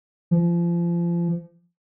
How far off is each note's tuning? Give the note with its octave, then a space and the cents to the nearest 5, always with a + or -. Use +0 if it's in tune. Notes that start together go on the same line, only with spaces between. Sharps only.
F3 -30